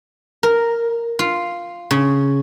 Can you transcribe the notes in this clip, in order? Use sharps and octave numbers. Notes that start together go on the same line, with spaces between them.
A#4
F4
C#3